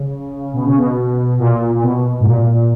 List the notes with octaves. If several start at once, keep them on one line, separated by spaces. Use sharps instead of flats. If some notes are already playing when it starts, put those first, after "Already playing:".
Already playing: C#3
B2
C#3
B2
A#2
A#2
B2
G#2
A#2